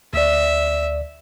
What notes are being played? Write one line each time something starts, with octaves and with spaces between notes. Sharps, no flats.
D2 D5 E5